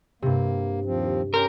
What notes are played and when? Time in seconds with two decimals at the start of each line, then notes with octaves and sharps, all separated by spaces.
0.22 G2 C3 A#3
0.85 D#2 F3 C4
1.34 C#4 G4 A#4 C6 G6